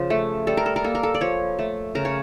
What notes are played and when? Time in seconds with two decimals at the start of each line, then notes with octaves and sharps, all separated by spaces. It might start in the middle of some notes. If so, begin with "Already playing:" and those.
Already playing: C#3 F3
0.10 A3
0.47 G3 A4
0.57 A#4
0.66 A4
0.76 A#4
0.84 A#3 A4
0.95 A#4
1.03 A4
1.14 D5
1.21 F3 C#5
1.59 A3
1.95 C#3 A#4
2.05 C#5